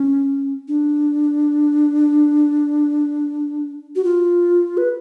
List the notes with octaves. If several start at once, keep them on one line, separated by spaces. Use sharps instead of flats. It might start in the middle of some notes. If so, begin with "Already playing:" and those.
Already playing: C#4
D4
F#4
F4
B4